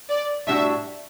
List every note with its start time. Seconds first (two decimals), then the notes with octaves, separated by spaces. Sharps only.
0.09 D5
0.47 A2 G3 D4 F#4 E5